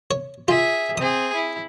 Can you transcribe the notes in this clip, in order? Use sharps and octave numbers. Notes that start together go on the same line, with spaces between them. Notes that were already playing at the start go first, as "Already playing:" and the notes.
C#5
F4 G#4 E5
C4 G#4 D#6
E4